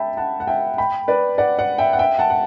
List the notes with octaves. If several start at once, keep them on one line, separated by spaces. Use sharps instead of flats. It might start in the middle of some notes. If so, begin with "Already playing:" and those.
Already playing: E5 G5 A5 B5
F#5 A5
F#5
E5 G5
G5 B5
B4 D5
D5 F#5
D5 F#5
E5 G5
F#5
E5 G5
F#5 A5
F#5